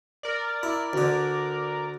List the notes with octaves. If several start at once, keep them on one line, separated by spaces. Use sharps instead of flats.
A#4 D5
E4
D2 D3